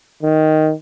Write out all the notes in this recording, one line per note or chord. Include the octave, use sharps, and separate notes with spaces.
D#3